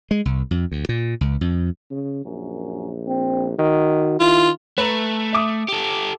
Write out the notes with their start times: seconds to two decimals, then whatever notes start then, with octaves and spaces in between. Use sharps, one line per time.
0.11 G#3
0.25 C2
0.51 F2
0.72 D2
0.89 A#2
1.21 C#2
1.41 F2
1.91 C#3
2.25 A#1 F#2
3.07 C4
3.58 D#3 F#4
4.20 D#3 E4 F4
4.78 A3 B4 A#5
5.33 E5 D6 D#6
5.68 G4 A4